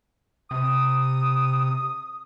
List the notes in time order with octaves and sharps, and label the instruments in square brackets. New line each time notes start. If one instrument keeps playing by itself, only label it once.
[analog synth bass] C3 [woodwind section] D#6